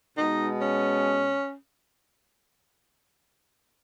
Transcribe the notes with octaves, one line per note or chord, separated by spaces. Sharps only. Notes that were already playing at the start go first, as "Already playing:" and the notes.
B2 G#3 B3 D#4
C#4